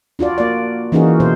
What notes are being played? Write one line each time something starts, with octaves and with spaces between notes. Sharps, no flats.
D4 F4 F#4 D5
A#3 D5
E3 A#3 C#4 D#4 F#4 G#4
B2 C5